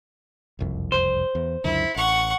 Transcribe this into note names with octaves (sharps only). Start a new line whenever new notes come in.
F#1 C2 F2
C5
E2
C#2 F#2 D3 E4
A1 F#5 C#6